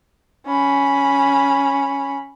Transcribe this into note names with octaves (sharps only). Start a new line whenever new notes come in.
C#4 B5